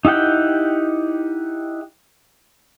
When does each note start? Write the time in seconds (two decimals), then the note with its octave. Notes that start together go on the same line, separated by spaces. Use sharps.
0.05 D#4 E4 G4 F#5 G5